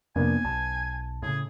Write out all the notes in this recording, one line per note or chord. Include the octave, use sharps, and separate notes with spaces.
F2 C3 F3 A#3 B3 D4 G#5
B1 A5
A2 C#3 G#4